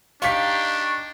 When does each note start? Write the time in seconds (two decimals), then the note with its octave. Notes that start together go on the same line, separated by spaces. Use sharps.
0.22 D4 D#4 G4 F5 C#6 B6